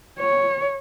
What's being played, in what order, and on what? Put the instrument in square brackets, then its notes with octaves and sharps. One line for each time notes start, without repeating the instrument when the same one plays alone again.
[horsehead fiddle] C#5